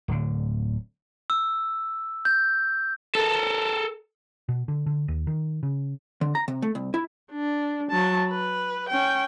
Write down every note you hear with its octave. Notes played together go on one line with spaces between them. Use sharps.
D1 D3
E6
G6
A4 A#4
B2
D3
D3
D#2
D#3
C#3
D3
A#5
C3
A3
C2
E4
D4
F#3 A5
B4
C#4 G5